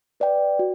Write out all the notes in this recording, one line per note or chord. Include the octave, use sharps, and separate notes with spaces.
B4 D5 G5
F#4